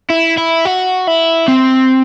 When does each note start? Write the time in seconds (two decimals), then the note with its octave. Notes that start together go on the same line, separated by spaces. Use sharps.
0.10 E4
0.37 E4
0.65 F#4
1.07 E4
1.48 C4